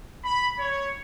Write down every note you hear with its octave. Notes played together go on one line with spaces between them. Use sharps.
B5
C#5